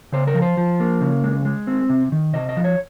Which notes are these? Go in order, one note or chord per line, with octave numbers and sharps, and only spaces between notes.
C#3 C5
A#4
F3
C5
F3
A#3
C#3
G#3
G#3
C4
C3
D#3
C3 D#5
D#5
F3
C#5